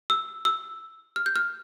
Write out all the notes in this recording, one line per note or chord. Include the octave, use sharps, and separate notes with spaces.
E6
E6
F6
G6
F6